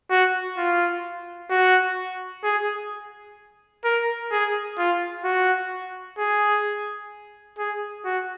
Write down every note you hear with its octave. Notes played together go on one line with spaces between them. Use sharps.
F#4
F4
F#4
G#4
A#4
G#4
F4
F#4
G#4
G#4
F#4